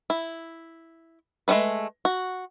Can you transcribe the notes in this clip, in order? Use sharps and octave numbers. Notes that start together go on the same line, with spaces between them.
E4
G#3 A3 C#4 D#4 B4
F#4